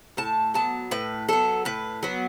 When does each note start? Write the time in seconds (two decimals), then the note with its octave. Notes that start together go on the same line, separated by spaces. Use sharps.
0.17 A2 A5
0.54 F#3 B3 A5
0.91 A2 B4
1.29 F#3 B3 A4
1.65 A2 B4
2.03 F#3 B3